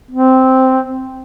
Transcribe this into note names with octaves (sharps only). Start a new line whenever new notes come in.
C4